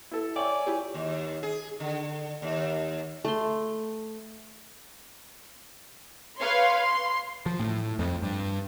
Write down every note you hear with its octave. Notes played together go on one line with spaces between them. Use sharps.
E4 A4
C#5 D5 E5 G5 G#5 C#6 F#7
E4 G4 G#4
D#2
G#4
D3
D#2
A3 C6
B4 C#5 F5 C6
C6
F3
A2
F2
G2